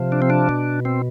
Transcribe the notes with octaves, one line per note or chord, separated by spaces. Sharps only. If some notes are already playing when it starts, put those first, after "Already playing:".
Already playing: C3 F3
D4
C4
D4
B2
C4